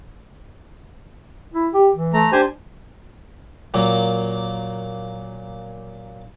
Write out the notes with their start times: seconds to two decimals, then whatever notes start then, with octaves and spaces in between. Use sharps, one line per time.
1.54 E4
1.74 G4
1.95 E3
2.14 A3 A#5
2.32 D4 G4 C5 G#5
3.74 A#2 F#3 A#3